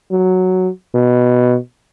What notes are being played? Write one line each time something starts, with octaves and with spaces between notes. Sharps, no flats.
F#3
B2